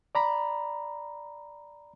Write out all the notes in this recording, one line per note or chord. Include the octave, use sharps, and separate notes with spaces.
D5 A#5 B5